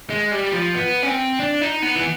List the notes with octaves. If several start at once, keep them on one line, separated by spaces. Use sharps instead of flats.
G#3
G3
F3
B3
C#4
C4
D4
D#4
B3
E3